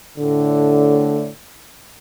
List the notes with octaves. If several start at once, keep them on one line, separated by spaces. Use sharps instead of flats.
A2 D3